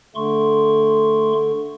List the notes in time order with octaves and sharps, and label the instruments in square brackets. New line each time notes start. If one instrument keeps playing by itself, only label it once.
[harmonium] D3 [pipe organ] A3 C6 C#6